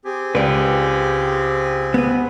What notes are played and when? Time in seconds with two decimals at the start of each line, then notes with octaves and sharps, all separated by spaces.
0.05 C4 G4 G#4 G#5
0.35 C#2 B4 D5
1.94 B3 B4